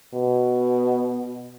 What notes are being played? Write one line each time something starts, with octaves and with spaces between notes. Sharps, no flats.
B2